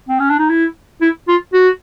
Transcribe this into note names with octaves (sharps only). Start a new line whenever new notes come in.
C4
C#4
D4
D#4
E4
E4
F4
F#4